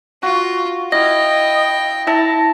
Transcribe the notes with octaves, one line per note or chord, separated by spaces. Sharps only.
F4 F#4
E4 D#5 F5 G5 A#6
E4 E5 A5 A#5